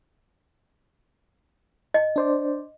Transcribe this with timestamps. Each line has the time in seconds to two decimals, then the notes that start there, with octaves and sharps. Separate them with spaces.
1.94 D#5
2.16 D4 C5 D5